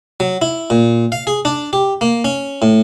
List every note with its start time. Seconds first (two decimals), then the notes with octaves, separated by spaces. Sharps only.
0.20 F#3
0.42 E4
0.70 A#2
1.12 F5
1.27 G#4
1.45 D4
1.73 G4
2.01 A#3
2.25 C#4
2.62 A2